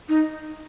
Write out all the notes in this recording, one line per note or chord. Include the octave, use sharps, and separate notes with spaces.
D#4